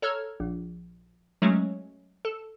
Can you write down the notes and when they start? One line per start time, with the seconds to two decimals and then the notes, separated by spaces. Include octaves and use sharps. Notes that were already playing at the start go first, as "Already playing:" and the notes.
0.02 A4 C#5 A#5 E6 F6 G#6
0.40 A#1
1.42 F#3 G#3 A3 C#4
2.25 A4